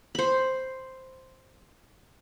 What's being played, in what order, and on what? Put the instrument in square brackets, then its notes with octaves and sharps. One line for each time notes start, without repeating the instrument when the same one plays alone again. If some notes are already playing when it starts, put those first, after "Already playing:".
[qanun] C5 B5